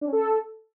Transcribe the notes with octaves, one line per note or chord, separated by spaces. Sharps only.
D4
C#4
A4